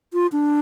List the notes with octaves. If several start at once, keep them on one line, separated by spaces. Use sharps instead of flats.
F4
D4